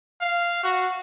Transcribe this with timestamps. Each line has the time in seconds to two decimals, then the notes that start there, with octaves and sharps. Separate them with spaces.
0.21 F5
0.64 F#4